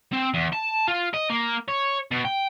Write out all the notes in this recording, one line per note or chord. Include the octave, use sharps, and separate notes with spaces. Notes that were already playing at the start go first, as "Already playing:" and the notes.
C4
E2
A5
F4
D#5
A#3
C#5
B2
G5